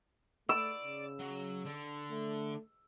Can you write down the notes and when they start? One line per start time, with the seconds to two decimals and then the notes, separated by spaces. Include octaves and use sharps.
0.49 A3 D5 E6
0.84 C#3
1.19 F#3
1.65 D3
2.11 A3